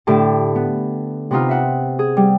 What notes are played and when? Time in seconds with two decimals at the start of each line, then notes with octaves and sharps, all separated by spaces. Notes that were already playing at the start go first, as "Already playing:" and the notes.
0.07 A2 D3 G4 A5
0.55 B3
1.31 C3 B3 C4 D#4 F4
1.49 E5 F#5
1.99 G#4
2.17 G3